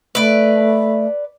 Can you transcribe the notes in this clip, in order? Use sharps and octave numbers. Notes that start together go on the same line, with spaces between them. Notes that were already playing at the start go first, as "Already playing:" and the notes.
A3 B4 D5